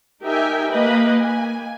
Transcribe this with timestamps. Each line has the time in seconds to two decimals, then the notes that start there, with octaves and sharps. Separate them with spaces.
0.23 D#4 G4 A#4 E5 G5 G#5
0.69 A#3 B4 D#5 B5
1.20 A#3 G#5